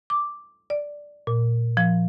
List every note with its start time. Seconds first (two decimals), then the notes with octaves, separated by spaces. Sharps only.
0.10 D6
0.70 D5
1.27 A#2
1.77 F3